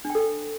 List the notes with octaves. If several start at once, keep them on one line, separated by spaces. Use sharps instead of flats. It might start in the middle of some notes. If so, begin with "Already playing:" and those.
D4
G5
A4
G5